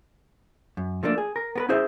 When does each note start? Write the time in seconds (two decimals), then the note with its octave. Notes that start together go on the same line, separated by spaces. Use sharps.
0.77 F#2
1.03 F3 A3 A#3 D4
1.18 G#4
1.36 A#4
1.56 B3 A#4 B4
1.69 C#4 E4 G#4 C5 E5